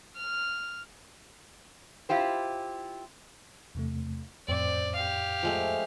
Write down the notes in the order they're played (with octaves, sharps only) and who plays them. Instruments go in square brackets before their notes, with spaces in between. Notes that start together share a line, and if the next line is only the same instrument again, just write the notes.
[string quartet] F6
[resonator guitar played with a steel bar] E4 F4 G4 C5
[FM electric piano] E2 C3 A3
[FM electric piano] F2 A2 [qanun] C4 [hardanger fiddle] D5
[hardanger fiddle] G4 F5
[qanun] F3 G#3 A3